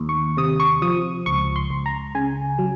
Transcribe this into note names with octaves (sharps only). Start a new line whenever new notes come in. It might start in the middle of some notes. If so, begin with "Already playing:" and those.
Already playing: D#2
C#6
C3 D#6
C#6
F3 D#6
C#2 C#6
C6
C#2
A#5
C#3 G#5
F#3